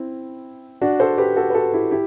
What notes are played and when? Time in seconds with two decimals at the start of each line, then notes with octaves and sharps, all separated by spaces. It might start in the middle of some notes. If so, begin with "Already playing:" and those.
Already playing: C4 E4
0.81 D4 F#4
1.00 A4 C5
1.18 G4 B4
1.36 F#4 A4
1.50 B4
1.54 F#4 A4
1.73 E4 G4
1.91 E4 G4